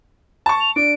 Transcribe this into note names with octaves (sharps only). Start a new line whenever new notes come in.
A5 C#6
F7
D4 D7